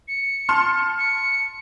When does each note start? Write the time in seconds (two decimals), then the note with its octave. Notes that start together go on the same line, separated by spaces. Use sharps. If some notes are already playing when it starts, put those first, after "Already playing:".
0.08 C#7
0.49 A5 C6 F6
0.98 C#7